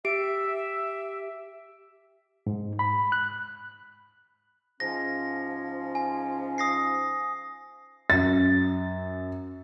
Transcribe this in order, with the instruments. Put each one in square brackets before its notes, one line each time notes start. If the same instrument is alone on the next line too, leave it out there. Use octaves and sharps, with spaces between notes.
[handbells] G4 D7 [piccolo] E5
[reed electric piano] G#2
B5
F#6
[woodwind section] G#2 F3 C#4 [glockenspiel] A#6
[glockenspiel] G#5
D#6 A#6 C7
[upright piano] F#2 A6